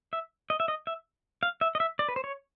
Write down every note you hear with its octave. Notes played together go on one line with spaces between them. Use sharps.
E5
D#5
E5
D#5
E5
F5
E5
D#5
E5
D5
B4
C5
C#5